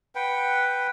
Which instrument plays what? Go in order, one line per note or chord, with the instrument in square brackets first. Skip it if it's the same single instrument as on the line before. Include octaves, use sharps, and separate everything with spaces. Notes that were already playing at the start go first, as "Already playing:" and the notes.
[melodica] B4 F#5 G5